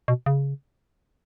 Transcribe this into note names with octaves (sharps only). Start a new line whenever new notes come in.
B2
C#3